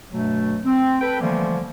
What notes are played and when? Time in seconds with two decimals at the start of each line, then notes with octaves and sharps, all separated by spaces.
0.13 G2 B2 F#3 A3
0.65 C4
1.01 A4 B4 G5
1.21 D3 E3 F3 G3 A3 A#3